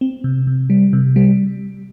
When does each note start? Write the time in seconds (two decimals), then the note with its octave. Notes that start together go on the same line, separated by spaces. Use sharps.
0.01 C4
0.24 C3
0.47 C3
0.70 G3
0.93 C3
1.16 G3